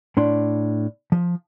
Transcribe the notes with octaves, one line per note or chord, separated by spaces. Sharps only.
A2 D4 C6
F3